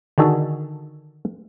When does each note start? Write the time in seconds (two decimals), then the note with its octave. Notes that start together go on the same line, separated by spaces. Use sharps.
0.18 D3 D#3 F#4 G#4 A4